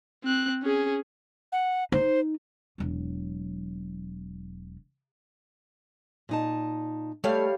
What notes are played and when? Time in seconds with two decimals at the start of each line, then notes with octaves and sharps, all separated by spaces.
0.24 C4 F#6
0.63 C#4 G#4
1.52 F#5
1.92 D#4 C5
2.78 E1 F#3
6.29 A#2 D#4 A5
7.24 G3 A3 C#5 F5